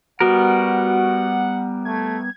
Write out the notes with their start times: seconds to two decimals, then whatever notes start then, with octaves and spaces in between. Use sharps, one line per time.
0.20 G3 B3 F#4 A#4 F#5
1.85 A3 G#6